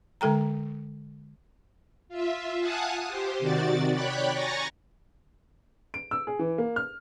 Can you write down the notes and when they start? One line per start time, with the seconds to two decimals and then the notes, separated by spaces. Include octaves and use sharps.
0.21 D3 G#3 A4 G5 A#5
2.09 F4 E5
2.59 F5 F#5 G#5 A5 D#6 F#6
3.08 G4 C5
3.39 C3 D#3 F#4 D5 A6
3.93 C#5 D5 G5 B5 F#6
4.32 G#5 A#5 C#6 A6 A#6
5.94 D7
6.11 E6
6.27 G#4
6.39 E3
6.58 A#3
6.76 F6